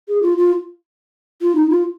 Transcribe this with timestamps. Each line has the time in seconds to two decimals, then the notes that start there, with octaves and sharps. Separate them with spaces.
0.09 G#4
0.23 F4
0.38 F4
1.41 F4
1.56 D#4
1.70 F4